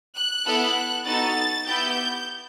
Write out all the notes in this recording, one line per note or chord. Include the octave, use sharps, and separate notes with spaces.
F#6
B3 E4 A4
B3 D#4 F#4 A4 A6
B3 E4 G4 G6